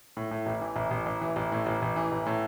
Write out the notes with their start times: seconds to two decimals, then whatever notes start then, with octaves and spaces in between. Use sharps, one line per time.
0.17 A2
0.31 A2
0.46 A1
0.62 E3
0.76 A1
0.91 A1
1.06 A1
1.21 E3
1.36 A1
1.52 A2
1.66 A1
1.82 A1
1.96 E3
2.12 A1
2.26 A2